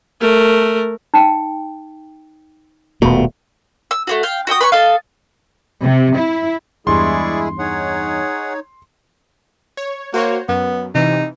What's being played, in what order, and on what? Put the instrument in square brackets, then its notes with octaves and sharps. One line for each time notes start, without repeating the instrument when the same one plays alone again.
[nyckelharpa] A3 A#4
[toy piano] D#4 G5
[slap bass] D#1 A3 [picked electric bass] B2
[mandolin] E6
A3 A#3 F#4
F5 G5
F#4 E5 G5 D#6
B4 G#5 B5 C#6
A4 D#5 F5
[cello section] C3
E4
[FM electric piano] E2 G2 [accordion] G#3 E4 G#4 [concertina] D5 C#6 [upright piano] C6
[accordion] D#4 C#5 [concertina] G#4 F#5
[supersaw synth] C#5
[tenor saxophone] A#3 [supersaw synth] F#4 C5 C#5
[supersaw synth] F#2 [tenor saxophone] B3
[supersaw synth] C3 E3 [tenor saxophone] D#4